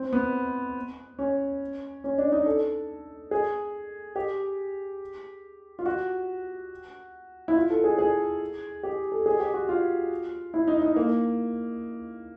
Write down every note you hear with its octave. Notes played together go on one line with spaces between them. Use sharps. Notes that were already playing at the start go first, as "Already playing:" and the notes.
Already playing: C4
B3
C#4
C#4
D4
D#4
A4
G#4
G4
F4
F#4
E4
F4
A4
G#4
G#4
G4
A4
G#4
G4
F#4
F4
E4
D#4
D#4
A#3